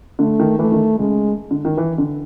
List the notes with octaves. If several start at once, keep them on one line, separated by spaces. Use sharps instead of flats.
D3 A3
D#3
E3 A3
D#3
C#3 G#3
D3
D#3
E3
D3